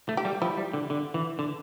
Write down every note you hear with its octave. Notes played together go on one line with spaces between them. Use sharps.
A3
G4
G3
F3 E4
G3
D3
D3
E3
D3